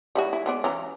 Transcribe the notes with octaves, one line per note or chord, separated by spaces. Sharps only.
G3 E4 F#4
E4
G#3 B3 D5
E3 C#4 A#5